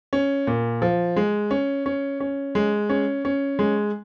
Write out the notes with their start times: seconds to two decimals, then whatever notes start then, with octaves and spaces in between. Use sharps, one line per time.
0.13 C#4
0.47 A#2
0.82 F3
1.16 G#3
1.51 C#4
1.86 C#4
2.20 C#4
2.55 G#3
2.89 C#4
3.25 C#4
3.59 G#3